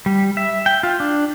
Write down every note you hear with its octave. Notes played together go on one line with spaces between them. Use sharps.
G3
E5
G5
F4
D4